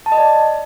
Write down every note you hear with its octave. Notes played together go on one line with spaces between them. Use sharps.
A5
D#5
D5